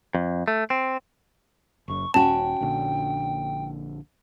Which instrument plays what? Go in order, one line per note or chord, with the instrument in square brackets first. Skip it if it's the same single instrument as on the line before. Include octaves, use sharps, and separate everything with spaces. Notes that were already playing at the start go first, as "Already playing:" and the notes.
[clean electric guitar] F2
A3
C4
[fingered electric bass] F#1 F#2 [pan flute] C#6
[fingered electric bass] D#1 [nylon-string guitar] C#4 F#4 [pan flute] G5 [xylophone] A5
[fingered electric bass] A#1 A#2 D3